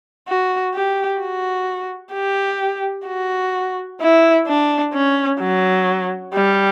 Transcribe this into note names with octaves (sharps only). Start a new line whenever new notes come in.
F#4
G4
F#4
G4
F#4
E4
D4
C#4
F#3
G3